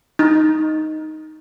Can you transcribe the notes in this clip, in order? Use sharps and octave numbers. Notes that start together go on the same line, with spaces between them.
D#4